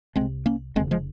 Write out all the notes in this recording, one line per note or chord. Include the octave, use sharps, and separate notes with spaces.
C2 G#3 C4
C3
A#3 C#4
F1 D#2 C#3 G#3 C4
F3 G#3